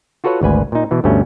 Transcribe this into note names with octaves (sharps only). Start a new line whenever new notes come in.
F4 F#4 A4 B4 C#5 F#5
G#1 D2 B4 G#5
A#2 D#4
B2 E3
D2 G2 B2 A3 C#4